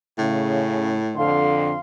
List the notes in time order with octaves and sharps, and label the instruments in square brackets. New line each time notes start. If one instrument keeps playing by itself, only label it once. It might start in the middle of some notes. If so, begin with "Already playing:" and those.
[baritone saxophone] A2 [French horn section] C#3
[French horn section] F2 D3 [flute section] F5 C6